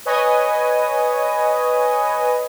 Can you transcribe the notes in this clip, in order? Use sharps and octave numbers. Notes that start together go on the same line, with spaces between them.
B4 C#5 D#5 G#5 D#6